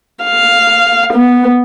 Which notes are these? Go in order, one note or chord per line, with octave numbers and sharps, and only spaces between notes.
F5
B3